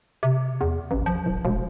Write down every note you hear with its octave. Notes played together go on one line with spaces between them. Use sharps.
C3
E2
A1
F3
D1
E1